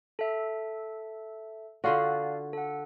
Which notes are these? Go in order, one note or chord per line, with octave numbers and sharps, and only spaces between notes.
A4 E5
D3 F4 F#4 A4 D5 F5
A4 F#5